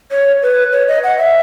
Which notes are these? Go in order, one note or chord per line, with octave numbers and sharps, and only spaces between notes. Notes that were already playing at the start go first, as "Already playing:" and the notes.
C#5
B4
C#5
D#5
F#5
E5